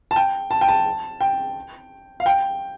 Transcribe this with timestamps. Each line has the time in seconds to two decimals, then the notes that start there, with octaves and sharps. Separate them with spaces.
0.11 A5
0.16 G5
0.51 A5
0.61 G5
0.68 A5
1.21 G5
2.20 F5
2.26 G5